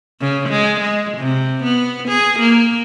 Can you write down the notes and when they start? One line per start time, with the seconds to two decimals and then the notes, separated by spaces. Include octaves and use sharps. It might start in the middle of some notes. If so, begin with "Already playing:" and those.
0.21 C#3
0.49 G#3
0.80 G#3
1.18 C3
1.63 B3
2.08 G#4
2.39 A#3